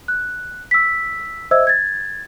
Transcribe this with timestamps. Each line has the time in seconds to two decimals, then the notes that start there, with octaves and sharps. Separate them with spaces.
0.08 F#6
0.71 E6 B6
1.51 C5 D#5 E5 E6 G#6
1.67 G#6 A6